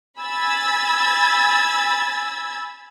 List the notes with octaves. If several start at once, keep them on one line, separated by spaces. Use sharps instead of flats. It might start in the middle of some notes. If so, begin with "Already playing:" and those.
G#5 B5 E6 G#6 A6